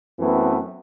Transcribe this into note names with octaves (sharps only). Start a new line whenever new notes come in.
F#2 E3 A3 B3 C4